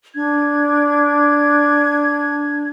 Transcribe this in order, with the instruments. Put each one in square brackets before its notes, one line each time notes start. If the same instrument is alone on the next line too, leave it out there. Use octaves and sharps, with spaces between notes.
[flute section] D4 G#6